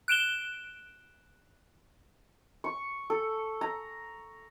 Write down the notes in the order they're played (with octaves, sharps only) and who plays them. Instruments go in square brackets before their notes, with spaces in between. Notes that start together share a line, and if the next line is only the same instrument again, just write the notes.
[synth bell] F#6 D7 E7 G7
[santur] C#6
A4
A#5